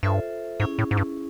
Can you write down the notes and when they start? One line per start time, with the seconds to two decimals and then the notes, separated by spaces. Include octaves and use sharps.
0.03 G2 F4 A4 C5 E5
0.60 G#2 C#4 E4 G#4
0.79 A2
0.91 G#2
0.97 G2